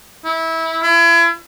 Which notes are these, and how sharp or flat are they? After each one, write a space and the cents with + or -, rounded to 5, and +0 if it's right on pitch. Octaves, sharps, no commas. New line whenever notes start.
E4 -20
E4 +35